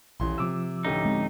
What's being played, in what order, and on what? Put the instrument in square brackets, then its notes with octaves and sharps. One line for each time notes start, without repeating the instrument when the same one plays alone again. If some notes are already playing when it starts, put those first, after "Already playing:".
[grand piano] D#1 E3 C6 [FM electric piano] A#1
[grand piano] C3 [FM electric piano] F3 D6 E6
[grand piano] A1 D2 G4 [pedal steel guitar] D#4
[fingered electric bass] G#3 C4